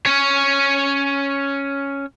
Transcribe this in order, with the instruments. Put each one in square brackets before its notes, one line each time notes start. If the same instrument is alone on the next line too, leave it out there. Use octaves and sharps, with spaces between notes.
[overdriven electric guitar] C#4 C#5